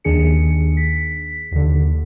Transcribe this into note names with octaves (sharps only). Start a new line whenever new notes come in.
D#2 D#3 D4 G#4 C#7
B6
D#2 D3